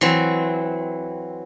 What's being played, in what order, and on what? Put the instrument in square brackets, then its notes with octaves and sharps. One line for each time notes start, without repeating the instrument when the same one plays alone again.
[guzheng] E3 F#3 C4